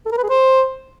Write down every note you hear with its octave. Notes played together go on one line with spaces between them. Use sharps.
A4
A#4
B4
G#4
C5